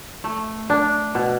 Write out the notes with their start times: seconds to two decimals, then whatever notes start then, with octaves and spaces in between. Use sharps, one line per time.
0.24 A3
0.70 D4
1.15 B2